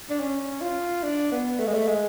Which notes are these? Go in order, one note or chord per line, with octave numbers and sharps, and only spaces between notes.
D4
C#4
F4
D4
B3
A3
G#3
A3
G#3